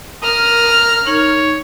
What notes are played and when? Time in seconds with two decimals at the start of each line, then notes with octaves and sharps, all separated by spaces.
0.23 A#4 A#5 D#6 F6
1.07 D#4 C#5